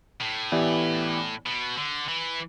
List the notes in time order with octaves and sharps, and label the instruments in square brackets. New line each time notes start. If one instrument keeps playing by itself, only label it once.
[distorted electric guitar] A2
[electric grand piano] E3 B3 E4 G4 D5
[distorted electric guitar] B2
D3
E3